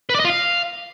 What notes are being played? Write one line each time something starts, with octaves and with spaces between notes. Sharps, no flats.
B4
D5
D#5
F4
F5